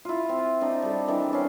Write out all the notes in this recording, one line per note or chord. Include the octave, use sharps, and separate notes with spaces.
E4 F4
C4
C4 D4 D#4
G3 A4
D#3 E3 G3 D4
C#4 F5